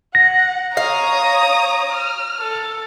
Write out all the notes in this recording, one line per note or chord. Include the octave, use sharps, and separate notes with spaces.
F#5 A#6
C#5 F5 A#5 D#6
F6
A4